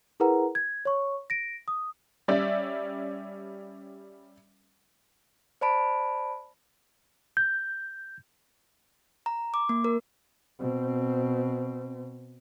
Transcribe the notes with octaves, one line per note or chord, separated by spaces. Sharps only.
E4 G#4 A#4 B4 F#5 A#5
G#6
C#5 C#6
A#6 D7
D#6
G3 C#4 D5 E5
C5 D5 A5 B5 D7
G6
A#5
D6
A#3
A#4
B2 C4